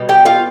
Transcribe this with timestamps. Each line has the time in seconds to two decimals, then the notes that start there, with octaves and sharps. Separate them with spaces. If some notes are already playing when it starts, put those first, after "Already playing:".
Already playing: B2 G3
0.09 G4 G5
0.25 F4 F5